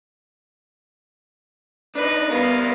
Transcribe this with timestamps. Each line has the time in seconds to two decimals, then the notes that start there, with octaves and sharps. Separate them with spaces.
1.95 D4 D#4 B4
2.31 G3 B3 A#4 B4 F5